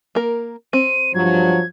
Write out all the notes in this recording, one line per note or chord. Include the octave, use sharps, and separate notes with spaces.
A#3 A#4
C4 D#7
G2 F3 F#3 G#6